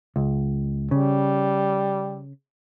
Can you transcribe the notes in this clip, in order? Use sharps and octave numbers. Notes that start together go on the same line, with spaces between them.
C#2
C#3 G3